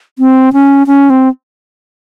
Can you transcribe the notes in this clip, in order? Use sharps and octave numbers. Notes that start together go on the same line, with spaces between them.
C4
C#4
C#4
C4